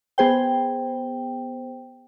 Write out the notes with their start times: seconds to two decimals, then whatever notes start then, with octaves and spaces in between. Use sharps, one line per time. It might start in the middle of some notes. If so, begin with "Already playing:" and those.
0.18 B3 G#4 C5 G5